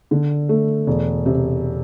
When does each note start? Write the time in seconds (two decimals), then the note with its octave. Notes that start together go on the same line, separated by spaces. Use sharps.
0.11 D3
0.49 A3
0.87 E1
1.26 C3